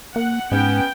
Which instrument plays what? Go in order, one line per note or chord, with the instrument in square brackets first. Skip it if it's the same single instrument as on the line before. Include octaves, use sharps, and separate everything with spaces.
[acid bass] A#3 [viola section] F#5
[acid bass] G#2 [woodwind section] B3 C#4 [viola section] G5